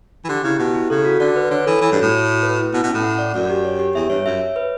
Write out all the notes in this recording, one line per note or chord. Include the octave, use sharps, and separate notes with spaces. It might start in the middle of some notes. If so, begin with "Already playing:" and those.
E3
D3 G4
C#3 E4
B2 G4
E4
C#3 A4
F#4
D3 D5
B4
D3 C#5
E3 A4
E3 C#5
G2
F#4
A2
C#5
F#4
B4
E4
B2 E4
B2
C#4
A2
F#5
D5
F#2 D5
G4
C#5
G4
E2 E5
G2 C#5
F#2 E5
C#5
B4